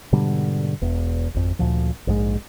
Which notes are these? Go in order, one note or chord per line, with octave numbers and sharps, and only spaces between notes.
G#2 B2 D3 G3
E1 E2
G#1 F2
D2 A#2 F3
A#1 G#2 D3 G#3